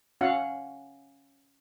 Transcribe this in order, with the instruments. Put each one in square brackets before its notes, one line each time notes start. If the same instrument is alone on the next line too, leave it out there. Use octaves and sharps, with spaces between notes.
[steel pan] C#4 F#4 F5 F#5